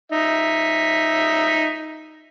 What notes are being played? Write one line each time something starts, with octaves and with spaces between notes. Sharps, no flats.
D#4 E5